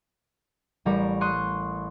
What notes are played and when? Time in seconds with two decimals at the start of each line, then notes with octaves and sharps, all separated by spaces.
0.85 A1 G3 A#4 C#6
1.21 C6 C#6 D#6 F#6 D#7